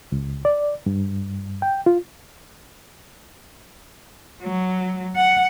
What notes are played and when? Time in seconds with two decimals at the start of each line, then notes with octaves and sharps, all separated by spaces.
0.12 C#2
0.45 D5
0.86 G2
1.62 G5
1.86 F4
4.42 F#3
5.16 F#5